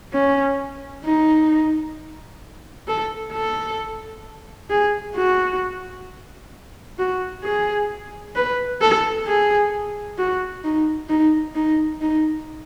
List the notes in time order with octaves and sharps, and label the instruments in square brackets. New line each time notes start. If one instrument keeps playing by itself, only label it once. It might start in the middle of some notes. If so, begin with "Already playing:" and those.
[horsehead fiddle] C#4
D#4
A4
A4
G#4
F#4
F#4
G#4
B4
A4
G#4
F#4
D#4
D#4
D#4
D#4